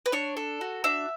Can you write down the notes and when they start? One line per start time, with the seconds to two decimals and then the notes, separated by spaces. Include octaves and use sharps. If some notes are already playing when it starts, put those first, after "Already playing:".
0.06 B4
0.12 D4 C#5
0.37 A4
0.61 F#4
0.84 D4 E5